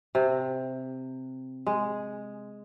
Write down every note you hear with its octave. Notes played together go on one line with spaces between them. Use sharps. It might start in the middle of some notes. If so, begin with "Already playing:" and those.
C3
G#3